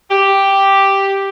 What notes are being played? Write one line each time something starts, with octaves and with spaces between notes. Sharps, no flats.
G4